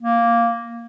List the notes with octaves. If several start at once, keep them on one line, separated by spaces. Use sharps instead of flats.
A#3